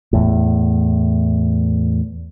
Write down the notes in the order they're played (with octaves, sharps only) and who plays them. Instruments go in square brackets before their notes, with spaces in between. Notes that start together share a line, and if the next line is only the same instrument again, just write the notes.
[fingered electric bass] E2 A2